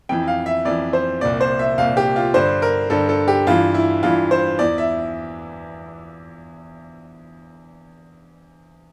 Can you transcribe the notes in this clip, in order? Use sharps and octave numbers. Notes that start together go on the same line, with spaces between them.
F2 E3 G5
F5
E5
F2 E3 D5
C5
C2 A#2 D5
C5
E5
C2 A#2 F5
G4
F4
G2 D3 C5
A#4
G2 D3 A4
A4
G4
G2 E3 F4
E4
G2 E3 F4
C5
E2 E3 D5
E5